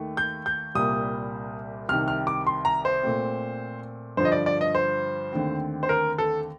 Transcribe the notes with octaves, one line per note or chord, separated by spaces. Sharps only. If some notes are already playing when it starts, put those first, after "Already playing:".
Already playing: D#2 D#3 A3
G6
G6
C2 A#2 G3 A#3 D#6
C2 C3 D#3 F6
F6
D6
C6
A#5
C5
A#2 A3 C4
G2 D3 F3 C5
D#5
D5
D5
D#5
C5
D#2 D3 A3 C4
C5
A#4
A4